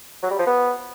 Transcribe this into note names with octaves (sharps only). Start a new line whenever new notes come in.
F#3
G3
F3
B3